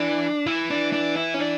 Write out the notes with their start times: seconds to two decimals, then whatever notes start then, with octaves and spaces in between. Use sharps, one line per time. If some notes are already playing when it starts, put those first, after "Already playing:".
Already playing: E3 D4
0.46 E3 E4
0.70 D4
0.93 D4
1.16 E4
1.34 C#4
1.39 D4